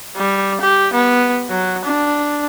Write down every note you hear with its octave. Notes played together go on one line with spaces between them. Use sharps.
G3
G4
B3
F#3
D4